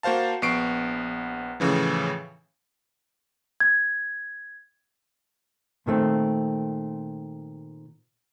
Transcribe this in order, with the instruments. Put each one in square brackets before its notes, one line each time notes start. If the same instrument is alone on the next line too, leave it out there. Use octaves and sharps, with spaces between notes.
[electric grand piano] A#3 F#4 C5 F5 A5
A#1 B3 C#6 C7 D7
A2 C#3 E3 F3
[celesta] G#6
[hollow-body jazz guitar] A#2 D#3 A3 C4